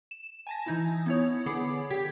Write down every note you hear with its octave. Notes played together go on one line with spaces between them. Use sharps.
E7
G#5 A5 A#6
E3 D#4 E4
B3 E4 C#5
D3 B3 G#4 B5 D6
D3 G4 G5 G#6